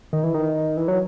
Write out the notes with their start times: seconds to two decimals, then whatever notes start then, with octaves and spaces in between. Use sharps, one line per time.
0.13 D#3
0.24 E3
0.34 D#3
0.77 E3
0.88 F#3